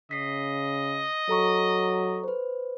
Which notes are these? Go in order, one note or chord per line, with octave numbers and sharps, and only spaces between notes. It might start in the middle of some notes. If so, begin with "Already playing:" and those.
C#3 D#5 B6 C7
F#3 A4 A#5 C#6
B4 C5